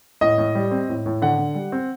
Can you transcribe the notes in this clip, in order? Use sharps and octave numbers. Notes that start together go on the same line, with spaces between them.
A2 D#5
A2
G3
C4
A2
A2
D3 F#5
D3
G3
C4